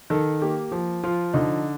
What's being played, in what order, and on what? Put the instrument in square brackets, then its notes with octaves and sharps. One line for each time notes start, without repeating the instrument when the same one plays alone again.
[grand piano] D#3 A4
A#3 G4
F3
F3 F4
D3 D#4